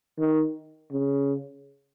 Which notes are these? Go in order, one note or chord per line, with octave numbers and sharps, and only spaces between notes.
D#3
C#3